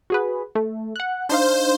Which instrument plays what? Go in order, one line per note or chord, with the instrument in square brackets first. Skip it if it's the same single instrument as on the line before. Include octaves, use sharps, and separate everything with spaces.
[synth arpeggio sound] F#4 G#4 B4
A3
F#5 F#6
[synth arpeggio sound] D4 D#4 F5 [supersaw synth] C5